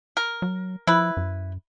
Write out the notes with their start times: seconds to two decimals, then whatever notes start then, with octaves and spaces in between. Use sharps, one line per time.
0.17 A#4
0.42 F#3
0.87 F3 E4 B4
1.17 F#2